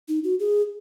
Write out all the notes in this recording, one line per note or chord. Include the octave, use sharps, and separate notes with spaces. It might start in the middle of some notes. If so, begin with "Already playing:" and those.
D#4
F#4
G#4